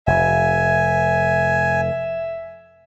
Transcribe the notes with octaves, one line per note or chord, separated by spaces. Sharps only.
F1 E5 G#5